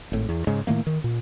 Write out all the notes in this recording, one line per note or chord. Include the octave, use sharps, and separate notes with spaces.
G#1 A2
E2
G#2 C#3 G#3
A2 D#3 A3 A#3
D#3
A#2